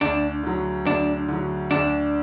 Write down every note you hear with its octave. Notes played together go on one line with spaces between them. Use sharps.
D2 D4
D3 F#3
D2 D4
D3 F#3
D2 D4